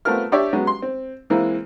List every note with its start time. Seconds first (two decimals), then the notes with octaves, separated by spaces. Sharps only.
0.05 A3 B3 C4 F4 A#4 F6
0.32 D4 G4 C#5 D5 E5
0.53 F#3 G#3 B3 C#4
0.67 C6
0.82 C4
1.30 E3 G#3 A#3 C4 E4